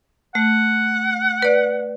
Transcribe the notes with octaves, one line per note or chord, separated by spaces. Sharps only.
A3 F#5
B4 D5